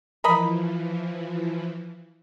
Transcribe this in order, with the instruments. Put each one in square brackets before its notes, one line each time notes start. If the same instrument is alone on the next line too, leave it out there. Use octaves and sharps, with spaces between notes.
[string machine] E3 F3 [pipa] A#4 D#5 B5